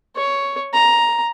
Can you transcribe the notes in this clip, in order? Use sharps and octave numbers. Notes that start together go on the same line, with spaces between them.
C#5
A#5